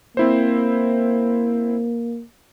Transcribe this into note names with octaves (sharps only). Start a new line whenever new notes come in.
A#3 C4 E4 C5